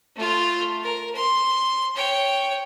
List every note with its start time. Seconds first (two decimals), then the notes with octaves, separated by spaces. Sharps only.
0.16 A3 F4
0.83 A#4
1.16 C6
1.96 C#5 G5